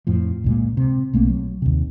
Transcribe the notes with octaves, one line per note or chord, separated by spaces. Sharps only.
F2 A2 F3
C#2 A#2 G#3
C3
B1 A3 A#3 C4
F#3
D#2 C3